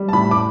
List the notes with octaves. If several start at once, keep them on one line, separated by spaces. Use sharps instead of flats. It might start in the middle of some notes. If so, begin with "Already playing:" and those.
Already playing: G3
A5
A2 B5
D6